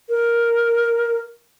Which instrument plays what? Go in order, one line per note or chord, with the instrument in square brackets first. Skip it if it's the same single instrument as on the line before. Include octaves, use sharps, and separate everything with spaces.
[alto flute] A#4